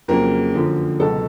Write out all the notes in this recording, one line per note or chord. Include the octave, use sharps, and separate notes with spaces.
F2 C#3 F#3 A#3 A#4
F#2 D3 F3
C#2 B2 F#3 A4